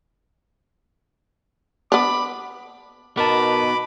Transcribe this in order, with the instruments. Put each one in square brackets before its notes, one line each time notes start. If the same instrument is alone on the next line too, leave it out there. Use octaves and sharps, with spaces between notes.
[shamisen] B3 D4 [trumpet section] B5 D6
[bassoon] B2 [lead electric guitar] B3 D#4 [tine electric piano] A#4 A5 [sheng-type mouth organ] B5 D6